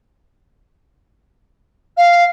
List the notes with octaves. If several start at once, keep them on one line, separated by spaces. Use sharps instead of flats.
F5